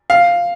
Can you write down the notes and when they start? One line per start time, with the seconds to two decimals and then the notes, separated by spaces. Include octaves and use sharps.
0.10 F5